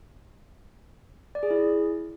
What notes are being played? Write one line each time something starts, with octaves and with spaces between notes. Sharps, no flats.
D5
G#4
E4